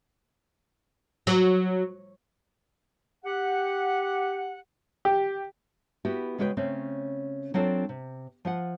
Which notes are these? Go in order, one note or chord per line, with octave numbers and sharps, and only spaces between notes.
F#3
G4 F#5
G4
B3 E4 F#4 G4
C#3 G#3 F#4 B4 C#5 G5
C#3 A3 C4 C#4
F#3 C4 D4 F4 A4
C3
F3 F4 F#5